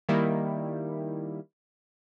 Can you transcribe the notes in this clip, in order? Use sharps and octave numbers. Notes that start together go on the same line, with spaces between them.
D#3 G3 A#3 E4